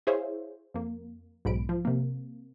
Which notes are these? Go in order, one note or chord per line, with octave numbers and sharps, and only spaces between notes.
E4 G#4 C5 C#5 E5 F5
F2 A#3
B1 G#2 B5 D7
F3
C3 A#3